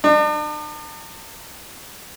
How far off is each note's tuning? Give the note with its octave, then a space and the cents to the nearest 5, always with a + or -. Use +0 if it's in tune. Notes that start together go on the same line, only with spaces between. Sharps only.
D4 +45